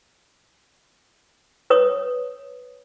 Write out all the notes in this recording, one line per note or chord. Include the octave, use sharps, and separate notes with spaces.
B4 C#5 D#6